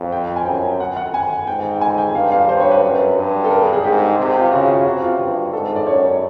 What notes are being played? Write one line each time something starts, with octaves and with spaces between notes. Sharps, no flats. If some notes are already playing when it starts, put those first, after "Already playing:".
Already playing: F2
G5
G#5
F#2 G5
F#5
F#5
G#5
G#2 G5
G#5
G5
G2 F5
F5
G2 C5
C#5
B4
F#2
G2
A4
A#4
G#4
G#4
G#2 G4
C3
F4
C#3 F#4
F4
C3 F#4
F4
G2
G#2 A4
D5
F#2 C#5